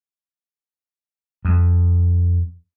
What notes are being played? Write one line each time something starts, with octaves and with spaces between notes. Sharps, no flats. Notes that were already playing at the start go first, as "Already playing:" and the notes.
F2